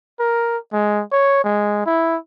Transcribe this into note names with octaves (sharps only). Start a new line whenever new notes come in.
A#4
G#3
C#5
G#3
E4